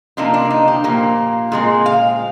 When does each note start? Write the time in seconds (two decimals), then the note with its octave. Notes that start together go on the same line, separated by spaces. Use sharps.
0.17 C3 F3 A#3 D4 D#4
0.34 D4
0.50 D#4
0.68 G4
0.84 A#2 F3 A#3
1.52 A#2 G#3 C4 G#4
1.86 F5